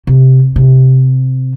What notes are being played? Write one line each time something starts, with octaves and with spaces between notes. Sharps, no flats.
C3
C3